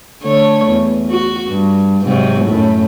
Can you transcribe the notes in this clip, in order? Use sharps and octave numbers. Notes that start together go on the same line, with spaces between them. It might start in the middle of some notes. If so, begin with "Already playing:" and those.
D3 A3 C#5
E2
F#4
G2
G#2 C3 F#3
F#2 A2